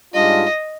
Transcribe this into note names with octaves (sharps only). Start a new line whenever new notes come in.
G#2 G3 D4 F4 D#5